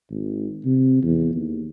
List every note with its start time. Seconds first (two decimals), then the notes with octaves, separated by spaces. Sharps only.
0.10 G#1
0.65 C3
1.03 E2
1.35 D#2